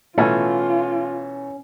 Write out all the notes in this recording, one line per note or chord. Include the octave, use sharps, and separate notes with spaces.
B2 E3 A3 C#4 F4